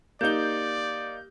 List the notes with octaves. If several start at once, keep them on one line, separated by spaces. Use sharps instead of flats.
A#3 D#4 G4 D5 G6 G7